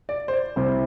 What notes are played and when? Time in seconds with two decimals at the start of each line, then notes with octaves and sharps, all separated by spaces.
0.09 D5
0.28 C5
0.33 D5
0.56 C2 C3 G3 C5